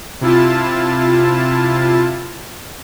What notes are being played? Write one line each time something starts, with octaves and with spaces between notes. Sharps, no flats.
C3 E4 F4 A5